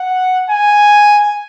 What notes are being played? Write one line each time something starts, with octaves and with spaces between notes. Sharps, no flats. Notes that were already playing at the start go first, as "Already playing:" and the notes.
Already playing: F#5
G#5